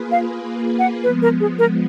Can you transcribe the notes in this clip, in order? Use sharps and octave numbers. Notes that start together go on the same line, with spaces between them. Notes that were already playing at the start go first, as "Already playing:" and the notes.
Already playing: A#3 F4 G#4 B4
F5
F#5
F3 G#3 B3 B4
A#4
G#4
A#4